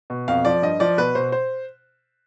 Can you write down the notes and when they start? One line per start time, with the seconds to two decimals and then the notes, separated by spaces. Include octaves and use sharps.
0.10 B2
0.28 F2 F5
0.45 F3 D5
0.62 G2 D#5
0.80 F3 D5
0.97 B2 B4
1.15 B2 C5
1.32 C5